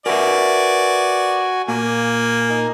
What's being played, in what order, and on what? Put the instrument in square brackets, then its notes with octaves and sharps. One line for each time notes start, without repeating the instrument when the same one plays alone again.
[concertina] F#4 G#5 [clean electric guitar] A#4 B4 E5 [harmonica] D5
[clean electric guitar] A#2 [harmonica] A#3 [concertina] G#5
[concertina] D#4 A#4 G#5